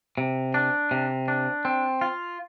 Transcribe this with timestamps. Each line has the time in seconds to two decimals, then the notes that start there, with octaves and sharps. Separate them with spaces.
0.18 C3
0.54 D4
0.91 C3
1.28 D4
1.65 C4
2.01 F4